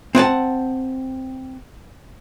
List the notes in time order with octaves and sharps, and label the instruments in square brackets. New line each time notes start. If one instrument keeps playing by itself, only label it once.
[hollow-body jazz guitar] C4 F#5 G#5 A5